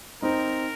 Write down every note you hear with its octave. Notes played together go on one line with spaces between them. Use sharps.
C4 D#4 A#4